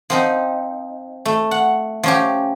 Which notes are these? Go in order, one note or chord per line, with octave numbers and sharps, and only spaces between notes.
F3 C4 D#4
A3
F#5
F3 C#4 G4